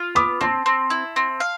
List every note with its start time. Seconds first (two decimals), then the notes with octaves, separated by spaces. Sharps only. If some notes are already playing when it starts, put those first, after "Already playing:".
Already playing: F4
0.15 B3 B5 D6
0.41 C4 A5 C6
0.66 C4
0.90 E4
1.16 C4
1.40 F5